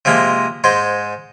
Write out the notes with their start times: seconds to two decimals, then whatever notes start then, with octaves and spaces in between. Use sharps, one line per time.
0.05 C3 F3 G#3 A#3
0.64 G#2 G#3 C5